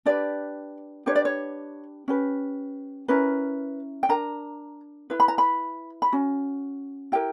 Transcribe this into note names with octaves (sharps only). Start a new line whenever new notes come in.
D4 G4 B4 D5
D4 G4 B4 C#5
D5
C#5
C#4 G4 B4
C#4 E4 A#4 B4
G5
D4 A#4 A#5
E4 B4
B5
A#5
B5
B5
C#4 F#4
E4 G4 A#4 G5